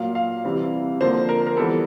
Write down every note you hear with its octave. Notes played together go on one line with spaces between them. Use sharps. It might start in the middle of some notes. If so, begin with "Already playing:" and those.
Already playing: A#2 F#3 A#3 F5
F5
C3 E3 G3 C4
D3 F3 A#3 C5
A#4
A#4
E3 G3 B3 A4